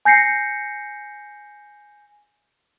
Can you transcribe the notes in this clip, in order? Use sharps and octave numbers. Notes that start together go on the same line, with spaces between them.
G#5 G6 A#6 C7 C#7